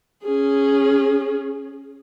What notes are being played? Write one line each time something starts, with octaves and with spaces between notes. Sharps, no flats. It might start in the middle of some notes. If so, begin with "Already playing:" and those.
C#4 G#4